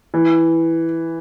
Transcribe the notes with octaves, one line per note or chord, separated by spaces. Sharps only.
E3